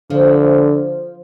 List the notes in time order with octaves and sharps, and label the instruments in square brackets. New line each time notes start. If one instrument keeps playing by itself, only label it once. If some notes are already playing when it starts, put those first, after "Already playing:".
[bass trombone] D3 [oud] F3